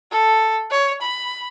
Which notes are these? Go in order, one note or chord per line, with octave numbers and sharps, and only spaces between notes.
A4
C#5
B5